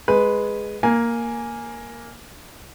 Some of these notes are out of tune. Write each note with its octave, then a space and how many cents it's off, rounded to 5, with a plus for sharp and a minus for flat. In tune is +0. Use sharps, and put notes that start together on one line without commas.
G#3 +0 B4 +0
A#3 +0 G#5 +0